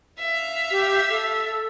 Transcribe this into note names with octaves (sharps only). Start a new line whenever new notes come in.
E5 F5
G4
A4